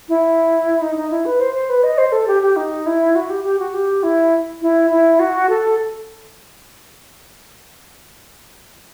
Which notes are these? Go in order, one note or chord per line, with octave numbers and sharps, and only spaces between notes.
E4
D#4
D#4
E4
B4
C5
C5
B4
D#5
C5
A4
G4
G4
D#4
E4
F#4
G4
G4
F#4
G4
E4
E4
E4
F#4
A4